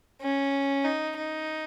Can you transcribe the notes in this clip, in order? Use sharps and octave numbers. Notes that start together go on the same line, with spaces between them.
C#4
D#4
D#4